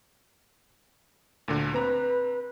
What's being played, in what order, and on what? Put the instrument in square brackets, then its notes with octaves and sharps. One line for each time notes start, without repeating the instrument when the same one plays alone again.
[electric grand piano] D2 A#2 D3
[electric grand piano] C4 A#5 [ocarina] B4